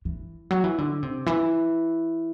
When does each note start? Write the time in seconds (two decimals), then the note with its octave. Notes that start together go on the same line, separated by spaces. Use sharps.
0.05 E3
0.51 F#3
0.64 E3
0.78 D3
1.03 C3
1.26 E3